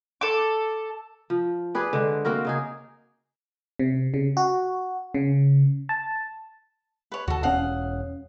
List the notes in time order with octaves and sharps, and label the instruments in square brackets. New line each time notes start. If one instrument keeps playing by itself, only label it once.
[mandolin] A4 D6
[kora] F3
G4 G#4 B4 D5
D3 G#3
A#3 C4 F#4 A#4
C#3 D#4 G#4
[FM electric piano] C3
C#3
F#4
C#3
A5
[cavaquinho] B4 C#5
[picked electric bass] D#2 [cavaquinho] F#4 A4
[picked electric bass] E1 C4 C#4 [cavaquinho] F5 F#5 D#6